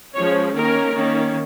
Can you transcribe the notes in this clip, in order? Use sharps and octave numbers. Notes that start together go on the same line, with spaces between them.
F3 G#3 C#4 C#5
D#3 A#3 C#4 A#4
D#3 A#3 C#4